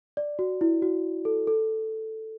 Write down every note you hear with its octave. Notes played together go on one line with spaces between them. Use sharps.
D5
F#4
E4
F#4
A4
A4